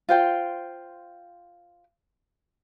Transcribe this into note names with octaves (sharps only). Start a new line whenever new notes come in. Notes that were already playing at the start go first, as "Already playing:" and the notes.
F4 C5 G5